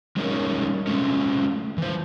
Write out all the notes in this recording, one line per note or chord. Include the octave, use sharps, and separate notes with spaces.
G3 G#3 C#4 D#4 A#4 C#5
G#3 A3 C#4
E3 C5